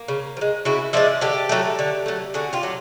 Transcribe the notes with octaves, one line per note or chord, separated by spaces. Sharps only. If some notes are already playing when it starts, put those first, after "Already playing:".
Already playing: A#3
C#3
F3
G#3
C#3 E4 F#4
F3 G#3 D5 E5
D3 G4 A4
F#3 A3
D3
F#3 A3
D3 F#4 G#4
F4 G4
F#3 A3